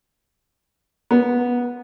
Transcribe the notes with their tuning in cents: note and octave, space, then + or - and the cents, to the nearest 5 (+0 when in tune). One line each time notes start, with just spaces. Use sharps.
B3 -15